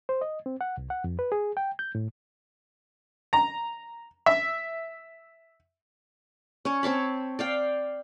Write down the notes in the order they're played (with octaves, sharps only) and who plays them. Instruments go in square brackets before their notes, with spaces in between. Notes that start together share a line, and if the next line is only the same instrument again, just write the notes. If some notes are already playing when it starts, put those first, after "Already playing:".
[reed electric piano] C5
D#5
C4
F#5
C2
F#5
F2
B4
G#4
G5
G6
A2
[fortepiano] A#5
E5
[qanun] C#4 C#5
C4 C#5 A5 B5
D5 F5 G5